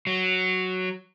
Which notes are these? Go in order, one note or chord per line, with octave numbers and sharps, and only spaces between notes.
F#3